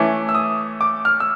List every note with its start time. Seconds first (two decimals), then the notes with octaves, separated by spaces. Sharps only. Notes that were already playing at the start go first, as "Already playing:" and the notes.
Already playing: E3 A3 C#4 D6
0.29 E6
0.35 D#6
0.81 D6
1.05 F6
1.20 E6